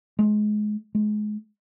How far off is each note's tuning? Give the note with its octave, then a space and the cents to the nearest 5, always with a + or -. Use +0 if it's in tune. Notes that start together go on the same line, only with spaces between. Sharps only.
G#3 +25
G#3 +30